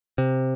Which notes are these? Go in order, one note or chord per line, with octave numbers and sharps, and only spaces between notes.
C3